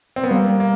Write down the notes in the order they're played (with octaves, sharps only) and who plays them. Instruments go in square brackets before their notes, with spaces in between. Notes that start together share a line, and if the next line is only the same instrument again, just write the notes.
[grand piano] C4
B3
[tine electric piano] G3 [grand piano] A#3
[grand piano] A#3